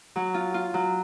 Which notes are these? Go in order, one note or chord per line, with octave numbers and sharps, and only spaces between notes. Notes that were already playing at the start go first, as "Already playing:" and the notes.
F#3
F4
F4
F#3